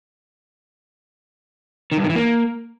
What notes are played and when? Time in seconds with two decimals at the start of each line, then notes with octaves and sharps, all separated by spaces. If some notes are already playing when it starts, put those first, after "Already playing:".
1.92 D#3
1.98 G2
2.04 D#3
2.09 E3
2.15 A#3